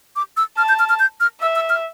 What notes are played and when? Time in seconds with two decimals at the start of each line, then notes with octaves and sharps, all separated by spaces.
0.16 D6
0.37 E6
0.57 A5 F6
0.69 G6
0.79 F6
0.89 F6
0.99 G6
1.20 F6
1.41 E5 E6
1.56 E6
1.69 F6